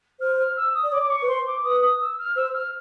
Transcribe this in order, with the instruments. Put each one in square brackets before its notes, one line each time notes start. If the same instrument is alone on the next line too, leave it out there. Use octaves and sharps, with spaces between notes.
[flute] C5 [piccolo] F6
[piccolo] F6
E6
D#6
[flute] D5
[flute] C#5 [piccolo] D6
[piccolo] D6
C#6
[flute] B4
[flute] C5 [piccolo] C6
[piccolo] D6
[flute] B4 [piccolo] D#6
[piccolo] D#6
E6
F6
[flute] C5 [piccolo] E6
[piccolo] F6